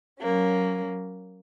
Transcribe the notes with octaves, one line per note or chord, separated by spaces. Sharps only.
F#3 A#3 C#4